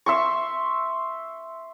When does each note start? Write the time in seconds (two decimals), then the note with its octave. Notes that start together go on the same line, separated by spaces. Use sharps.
0.06 E5 C6 C#6